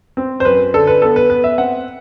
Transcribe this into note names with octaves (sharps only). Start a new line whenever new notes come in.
C4
C5
F#2 B4
D3 A4
B4
B3 A4
B4
B3 B4
E5
C4 F#5